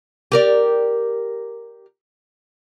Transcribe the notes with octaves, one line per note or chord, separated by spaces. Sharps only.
G4 A#4 D5